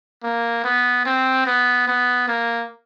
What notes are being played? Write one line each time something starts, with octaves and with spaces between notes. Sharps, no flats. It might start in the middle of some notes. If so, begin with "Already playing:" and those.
A#3
B3
C4
B3
B3
A#3